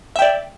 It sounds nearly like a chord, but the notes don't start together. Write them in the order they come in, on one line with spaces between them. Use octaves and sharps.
E5 G5 D5